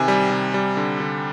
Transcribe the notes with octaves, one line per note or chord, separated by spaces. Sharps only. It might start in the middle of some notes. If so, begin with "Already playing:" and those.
Already playing: C3 D#3 G#5
G3
C3
G3
D3
D3